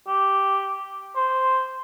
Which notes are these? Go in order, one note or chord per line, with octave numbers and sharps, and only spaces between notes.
G4
C5